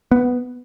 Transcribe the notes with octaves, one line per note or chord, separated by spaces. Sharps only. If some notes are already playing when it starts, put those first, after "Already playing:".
B3